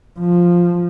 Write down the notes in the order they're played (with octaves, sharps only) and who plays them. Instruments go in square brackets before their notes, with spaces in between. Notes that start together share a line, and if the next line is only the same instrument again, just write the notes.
[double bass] F3